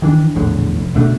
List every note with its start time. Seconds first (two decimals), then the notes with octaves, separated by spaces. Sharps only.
0.02 D#3 E3 D4
0.35 A#1 E2 A2 D3
0.74 F1
0.94 C#2 B2 A3 D4